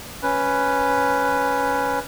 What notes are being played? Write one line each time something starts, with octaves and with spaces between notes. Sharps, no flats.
C#4 B4